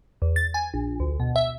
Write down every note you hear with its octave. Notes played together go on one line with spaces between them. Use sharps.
E2
A6
G#5
A#1
D2
B2
E5